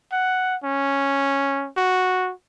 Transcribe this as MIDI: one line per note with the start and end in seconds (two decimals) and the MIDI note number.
0.12 0.56 78
0.64 1.68 61
1.77 2.32 66